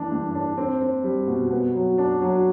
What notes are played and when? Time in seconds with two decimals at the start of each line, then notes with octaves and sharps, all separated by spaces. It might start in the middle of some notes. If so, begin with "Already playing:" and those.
Already playing: E3 D4
0.12 G2
0.35 D4
0.58 C4
0.81 C4
1.04 G3
1.27 B2
1.51 B3
1.74 F#3
1.98 D4
2.21 F#3